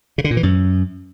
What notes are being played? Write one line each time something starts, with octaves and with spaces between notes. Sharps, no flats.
C#3
D3
A#2
E3
F#2